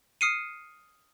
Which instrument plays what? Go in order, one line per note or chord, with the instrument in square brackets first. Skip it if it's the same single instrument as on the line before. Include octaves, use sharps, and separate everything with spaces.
[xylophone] D#6 F6 C7 C#7 D#7